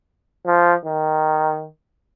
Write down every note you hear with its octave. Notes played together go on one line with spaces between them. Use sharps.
F3
D#3